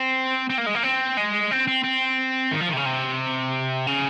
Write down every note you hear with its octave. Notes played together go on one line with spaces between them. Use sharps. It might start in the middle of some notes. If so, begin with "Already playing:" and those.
Already playing: C4
C4
A#3
G#3
A#3
C4
G#3
C4
C4
C4
D#3
F3
D#3
C3
C#3
C3
C#3